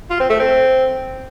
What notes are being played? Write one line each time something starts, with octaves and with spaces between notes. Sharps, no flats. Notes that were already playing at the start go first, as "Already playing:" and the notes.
F4
C4
A3
C4